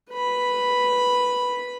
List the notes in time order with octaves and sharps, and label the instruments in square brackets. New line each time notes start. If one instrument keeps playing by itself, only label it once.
[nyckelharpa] B4 B5